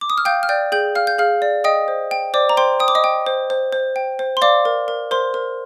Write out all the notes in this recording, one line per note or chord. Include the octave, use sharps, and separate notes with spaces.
D6
D#6
F6
F5 G5 G6
F6
D5 G5 G6
G#4 G5 G6
F5 F6
G6
G#4 F5 F6
D5
D#5 G5 D#6
C5
G5
C5 D5 D6
A#5
C5 G5 C6
G5 D#6
D6
D#5 D#6
G5
C5
C5
C5
G5
C5
C6
D5 F5 D6
A#4
A#4
A#4 C5 C6
A#4